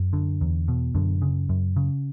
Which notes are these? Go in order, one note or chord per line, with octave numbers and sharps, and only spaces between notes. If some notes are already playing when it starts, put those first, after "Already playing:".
Already playing: F#2
D3
E2
B2
F#2 D3
C#3
F#2
C#3